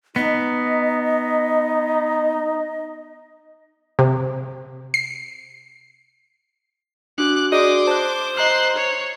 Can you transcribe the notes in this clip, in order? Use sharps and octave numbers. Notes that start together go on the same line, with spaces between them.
B3 D#4 D#5
C3
C7
D4 F#4 D6 F#6
F#4 G#4 D5 D#5 C6 D6
C5 A5 F#6
D#5 A#5 C6 F#6 C7
C#5